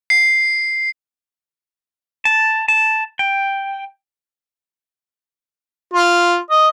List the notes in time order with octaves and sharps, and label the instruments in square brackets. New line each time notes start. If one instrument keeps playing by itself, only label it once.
[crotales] C7
[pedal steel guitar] A5
A5
G5
[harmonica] F4
D#5